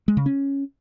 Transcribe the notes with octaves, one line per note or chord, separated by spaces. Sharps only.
G#3
C#3
C#4